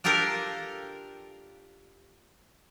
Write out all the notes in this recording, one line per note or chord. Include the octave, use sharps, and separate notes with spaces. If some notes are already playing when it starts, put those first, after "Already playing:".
D4 F4 G4 A4 A#4 F5